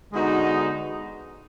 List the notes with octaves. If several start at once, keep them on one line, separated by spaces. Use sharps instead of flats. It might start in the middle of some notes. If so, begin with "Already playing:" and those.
D3 G#3 B3 D#4 F#4